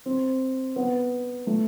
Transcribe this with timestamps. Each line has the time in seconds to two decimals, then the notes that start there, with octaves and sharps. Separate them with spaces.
0.06 C4
0.76 B3
1.47 A3